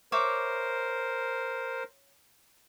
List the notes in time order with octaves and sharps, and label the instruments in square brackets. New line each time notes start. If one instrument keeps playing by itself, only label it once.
[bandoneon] A#4 C5 [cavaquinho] C#5 E5 D6